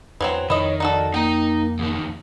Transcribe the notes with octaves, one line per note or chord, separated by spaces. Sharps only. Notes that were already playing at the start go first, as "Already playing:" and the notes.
E2 E3 F#3 C4
F2 D#3 E4 C#5 D#5
D#4 F#4 A4 D5
A#3 D#4 G5 A#5
E2 D#3